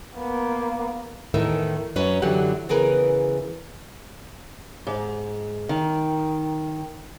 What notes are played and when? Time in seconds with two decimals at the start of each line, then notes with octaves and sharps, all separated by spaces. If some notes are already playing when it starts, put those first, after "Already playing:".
0.16 A#3 B3
1.34 E2 A2 D#3 E3 A#4 E5
1.96 F#2 F#3 C#4 B4
2.22 F#2 D3 E3 F#3 G4 F#5
2.69 C#3 E3 B3 G#4 A#4 B4
4.87 G#2
5.69 D#3